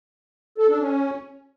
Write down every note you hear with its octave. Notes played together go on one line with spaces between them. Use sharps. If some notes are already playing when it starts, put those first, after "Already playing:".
A4
D4
C#4